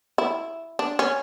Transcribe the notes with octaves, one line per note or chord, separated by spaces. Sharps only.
E4
D4
C#4